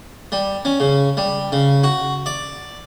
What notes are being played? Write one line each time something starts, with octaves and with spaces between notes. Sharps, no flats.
G3
C#4
C#3
G3
C#3
F#4
D5